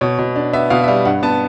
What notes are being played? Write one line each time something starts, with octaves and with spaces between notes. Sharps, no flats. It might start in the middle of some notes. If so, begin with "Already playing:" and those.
B2 C#5
B2
D4
B3 E5
B2 F5
E5
G3 F5
G2 F#5
B3 A5